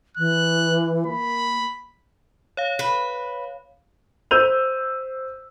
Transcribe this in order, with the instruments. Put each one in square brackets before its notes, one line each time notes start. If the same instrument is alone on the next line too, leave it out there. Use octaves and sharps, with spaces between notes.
[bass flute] E3 [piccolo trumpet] F#6
[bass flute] A#3 [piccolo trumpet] B5
[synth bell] C#5 F5
[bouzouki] B4
[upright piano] C5 E6 G6 D#7 F7